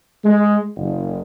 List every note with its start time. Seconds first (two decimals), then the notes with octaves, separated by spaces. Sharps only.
0.24 G#3
0.76 F#1